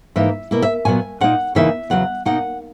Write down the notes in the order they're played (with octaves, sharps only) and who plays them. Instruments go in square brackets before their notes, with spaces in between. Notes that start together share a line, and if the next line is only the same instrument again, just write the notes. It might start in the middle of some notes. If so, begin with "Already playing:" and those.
[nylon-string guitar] G#2 E3 A#3 D#4 E5
B2 A#3 E4
E5
A#2 F#3 B3 G#5
A#2 A#3 D#4 F#5
E2 C#3 E3 A#3 D#4 E5
E2 C#3 F#3 F#5
B2 A#3 D#4 F#5